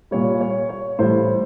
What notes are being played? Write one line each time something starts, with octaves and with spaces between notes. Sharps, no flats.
A#2 G3 C#5
C#5
C#5
A2 E3 G3 C5